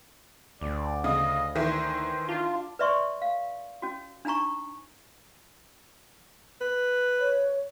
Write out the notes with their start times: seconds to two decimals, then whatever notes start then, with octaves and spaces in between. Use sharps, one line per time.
0.61 D2 D5
1.04 C#3 D#5
1.56 D#3 E3 C5
2.29 D4 F4
2.79 B4 D5 E5 C6 C#6
3.22 F5
3.82 C#4 F#4
4.25 D4 D#4 G#5 A#5 C#6
6.61 B4
7.20 C#5